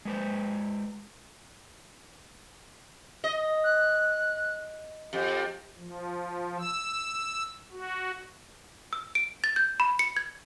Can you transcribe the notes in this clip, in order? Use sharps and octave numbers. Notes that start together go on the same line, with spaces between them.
G#3 B4 C5
D#5
F#6
F2 G4
F3
E6
F#4
E6
D7
A6
G6
B5
C#7
G#6